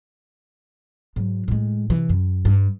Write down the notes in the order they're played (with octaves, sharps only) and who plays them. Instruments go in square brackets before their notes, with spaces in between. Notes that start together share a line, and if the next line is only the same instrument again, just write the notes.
[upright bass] G#2 F#3
A2 G#3
C3 E3
F#2
G2